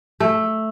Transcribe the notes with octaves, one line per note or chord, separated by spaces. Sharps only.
A3